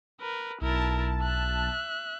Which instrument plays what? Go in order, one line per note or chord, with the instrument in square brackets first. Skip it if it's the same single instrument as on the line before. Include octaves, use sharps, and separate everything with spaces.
[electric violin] A#4 B4
[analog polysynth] B1 A5 [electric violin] E4 A#4
[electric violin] E5 F#6